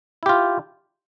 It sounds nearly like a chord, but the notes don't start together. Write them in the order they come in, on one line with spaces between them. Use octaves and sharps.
E4 G4 F4